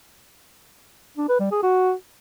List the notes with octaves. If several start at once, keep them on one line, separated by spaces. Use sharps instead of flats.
D4
B4
G3
G#4
F#4